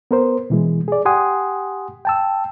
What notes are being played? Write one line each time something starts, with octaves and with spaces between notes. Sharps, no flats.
B3 A#4 C5
B2 E3 G#3
G#4 D5
G4 F#5 G#5 C6 D#6
G5 A5 E6